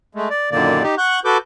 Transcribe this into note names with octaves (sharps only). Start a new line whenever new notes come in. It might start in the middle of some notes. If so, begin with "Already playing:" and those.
G#3 A3
D5
F#2 A#2 D3 D#3 A#3 D5
D#4 G4
F#5 C#6 F#6 G6
F#4 A4 B4 D6 G6